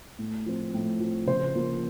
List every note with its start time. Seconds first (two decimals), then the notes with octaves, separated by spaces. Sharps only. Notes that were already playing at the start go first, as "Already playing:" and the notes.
0.19 A2
0.46 F3 C4
0.74 A2
1.00 F3 C4
1.27 C#3 C5
1.55 F3 A#3